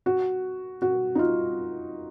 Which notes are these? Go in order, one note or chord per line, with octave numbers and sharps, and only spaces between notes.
F#4
F#4
D#4
F4